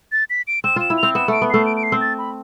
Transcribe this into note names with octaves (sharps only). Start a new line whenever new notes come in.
A6
B6
D7
C4 E7
F4 E7
E4
F7
C4
B3 E7
A3 D7
B3
A3 C7
D7
D7
C7
C4
A6
B5